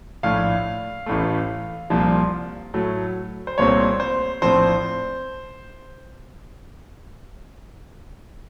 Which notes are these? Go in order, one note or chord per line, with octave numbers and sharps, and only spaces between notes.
A#1 A2 A3 F5
A1 A2 A3
C2 A#2 F3
A2 F#3 A3
C5
C2 A#2 A3 C4 C#5
C5
A#1 A2 F3 C4 C5